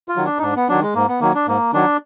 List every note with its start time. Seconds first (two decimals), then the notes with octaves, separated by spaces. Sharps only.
0.09 F4
0.16 D#3 F#3
0.25 D4
0.39 D#4
0.42 G#2 D4
0.56 B3
0.69 D#3 F#3 D4
0.82 G#3
0.95 G#2 A#3
1.08 B3
1.21 D#3 F#3 A#3
1.35 D4
1.48 G#2 A#3
1.73 D#3 F#3 D4